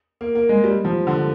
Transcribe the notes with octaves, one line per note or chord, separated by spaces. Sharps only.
A#3
A#3
G#3
G3
F3
D3